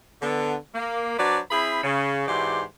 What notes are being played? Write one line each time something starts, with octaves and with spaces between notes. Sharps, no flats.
D3 B3
A#3
F#3 D4 B4 C5 D5
C4 E4 G#4 B5
C#3
G#2 E3 F#4 G4 D5 C6